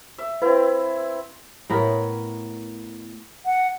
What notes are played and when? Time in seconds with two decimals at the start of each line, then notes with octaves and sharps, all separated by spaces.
0.18 E5
0.42 C4 E4 B4
1.70 A2 B3 A#4 C#5
3.45 F#5